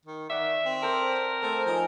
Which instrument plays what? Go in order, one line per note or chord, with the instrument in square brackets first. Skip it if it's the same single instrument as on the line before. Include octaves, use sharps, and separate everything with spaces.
[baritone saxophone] D#3
[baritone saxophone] D#3 [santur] D5 F#5 [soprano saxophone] E5
[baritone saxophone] C4
[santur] A4 C5 [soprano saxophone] A#4
[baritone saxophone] A3 [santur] C4
[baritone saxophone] F3 [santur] D#4 G#5 A#5